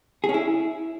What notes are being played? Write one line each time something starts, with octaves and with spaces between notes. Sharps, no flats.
G#4
C#4
E4